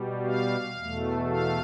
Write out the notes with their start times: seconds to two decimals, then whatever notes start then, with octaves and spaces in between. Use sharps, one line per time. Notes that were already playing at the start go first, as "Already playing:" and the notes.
Already playing: B2 G3
0.26 F5
0.78 E2 B2 A3
1.28 F5